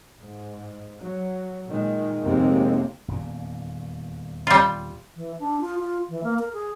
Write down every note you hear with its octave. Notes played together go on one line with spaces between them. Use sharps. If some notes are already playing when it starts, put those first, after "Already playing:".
G#2
F#3
A#2 D#3 G#3
F1 D#2 C3 G#3 A#3 C4
D#1 E2 A#2
G3 F4
E3
D4
F4
F4
E3
A#3
A#4
G#4